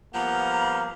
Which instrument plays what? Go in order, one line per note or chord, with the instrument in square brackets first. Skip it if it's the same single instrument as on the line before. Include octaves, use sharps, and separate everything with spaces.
[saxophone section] F3 G3 B3 [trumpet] A#3 [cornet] F#5 [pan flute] A#5